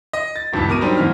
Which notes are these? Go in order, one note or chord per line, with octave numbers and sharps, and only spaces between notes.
D#5
A6
E1 C#2 G2 E3 A5
B2 A#4 D6 D#7
F#3 G3 D4 D#4 C5
G#2 B2 E3 C4 F6